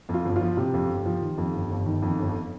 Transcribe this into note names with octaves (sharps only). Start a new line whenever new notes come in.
F2
F4
G1
F4
F3
C3 G4
F2
G1
F3
D#3
F2
G1
G1
D#3
F2
G1